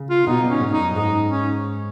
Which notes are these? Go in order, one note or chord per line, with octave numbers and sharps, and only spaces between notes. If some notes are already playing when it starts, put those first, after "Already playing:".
Already playing: C#3
F4
B2 D#4
A#2
C#4
G#2
D#4
F#2
G#2 D#4
C#4